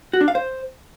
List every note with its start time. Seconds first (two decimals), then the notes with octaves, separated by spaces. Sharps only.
0.13 F#4
0.21 D4
0.28 F5
0.35 C5